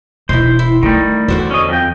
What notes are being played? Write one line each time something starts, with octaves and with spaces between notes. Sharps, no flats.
E1 D#4 E4 C5
E4
D#3 G3 A3
E2 D3 F#4 C5
C#4 D#5
F2 G5